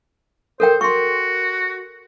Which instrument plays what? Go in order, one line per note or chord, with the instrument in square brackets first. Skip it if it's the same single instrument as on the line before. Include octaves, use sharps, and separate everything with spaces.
[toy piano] A4 A#4 G5 [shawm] C5
[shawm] F#4 [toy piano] C6 C#6